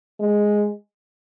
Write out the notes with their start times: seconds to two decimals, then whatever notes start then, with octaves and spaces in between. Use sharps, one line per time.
0.20 G#3